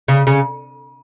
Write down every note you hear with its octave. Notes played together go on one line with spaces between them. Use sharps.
C#3
C#3